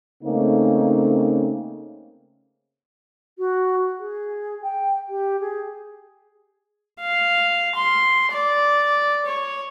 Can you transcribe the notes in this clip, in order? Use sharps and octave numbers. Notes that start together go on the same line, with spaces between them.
C#3 A3 A#3 C4 C#4 D#4
F#4
G#4
G5
G4
G#4
F5
C6
D5
C#5